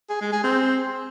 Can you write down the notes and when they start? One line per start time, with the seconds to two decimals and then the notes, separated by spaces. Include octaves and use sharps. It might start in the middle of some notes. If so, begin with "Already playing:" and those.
0.10 G#4
0.21 G#3
0.32 G#4
0.44 C4